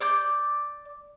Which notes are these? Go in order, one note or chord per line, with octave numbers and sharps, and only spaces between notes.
D5 D6 G6